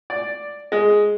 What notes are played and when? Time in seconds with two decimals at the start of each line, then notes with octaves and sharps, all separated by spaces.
0.10 D5
0.72 G#3